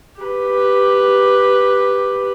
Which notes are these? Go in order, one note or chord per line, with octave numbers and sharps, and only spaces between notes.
G4 B4